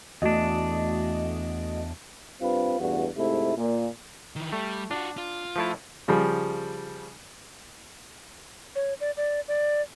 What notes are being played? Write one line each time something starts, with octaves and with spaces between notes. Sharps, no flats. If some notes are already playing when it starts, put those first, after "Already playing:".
E2 A3 D4 F#4 D#5
G2 C4 F4 B4
A1 E2 G2 F#4
G#2 C3 A3 E4
A#2
D#3 E3
G3 A3
D4 F4 F#4
F4
F3 A3 E4
C#3 F3 G3
C#5
D5
D5
D5